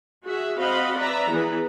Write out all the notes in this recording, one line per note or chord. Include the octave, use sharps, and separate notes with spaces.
F#4 G#4 E5
C4 F#4 D#5 F5 F#5 B5
B4 D5 E5 A#5
E3 B3 E4 G#4 B4